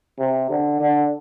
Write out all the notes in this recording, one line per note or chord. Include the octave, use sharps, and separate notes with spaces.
C3
D3
D3